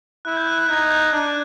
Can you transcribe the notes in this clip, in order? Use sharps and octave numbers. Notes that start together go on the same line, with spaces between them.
E4 F#6
G6
F#6
F#6
D#4 G#6
G6
D4 F#6